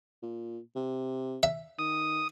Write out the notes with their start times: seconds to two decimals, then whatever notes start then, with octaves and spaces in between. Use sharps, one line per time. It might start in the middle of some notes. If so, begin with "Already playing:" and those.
0.23 A#2
0.75 C3
1.43 E5
1.79 D#3 D#6